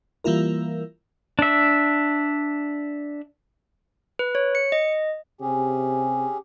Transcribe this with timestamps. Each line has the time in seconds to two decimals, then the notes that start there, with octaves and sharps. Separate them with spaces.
0.24 E3 G3 A#3 E4 F4 A#4
1.39 D4 E5
4.19 B4
4.35 C#5
4.55 C#7
4.72 D#5
5.41 C3 C#4 G4 G#4